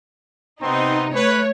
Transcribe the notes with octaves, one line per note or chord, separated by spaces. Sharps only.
C3 B3 C4 D#4 C6
A3 B4 C#5